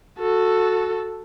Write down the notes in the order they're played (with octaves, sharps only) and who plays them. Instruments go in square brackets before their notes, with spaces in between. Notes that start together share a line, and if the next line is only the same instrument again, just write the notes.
[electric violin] F#4 A4